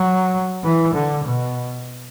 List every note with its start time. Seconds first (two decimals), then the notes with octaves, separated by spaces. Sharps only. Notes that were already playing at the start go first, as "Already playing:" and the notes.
Already playing: F#3
0.64 E3
0.94 D3
1.24 B2